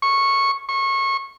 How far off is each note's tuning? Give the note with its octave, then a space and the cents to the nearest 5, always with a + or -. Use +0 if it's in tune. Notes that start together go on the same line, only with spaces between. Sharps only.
C#6 -10
C#6 -25